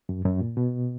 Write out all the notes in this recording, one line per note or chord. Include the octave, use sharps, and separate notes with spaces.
F#2
F#2
A#2
B2